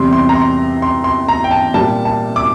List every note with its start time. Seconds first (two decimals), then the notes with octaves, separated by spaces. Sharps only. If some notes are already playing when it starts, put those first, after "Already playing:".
Already playing: E2 C3 G3 C6
0.13 C6
0.29 A#5
0.35 C6
0.82 C6
1.04 C6
1.28 A#5
1.44 G5
1.51 A5
1.74 A#2 G3 A5
2.05 A5
2.36 D6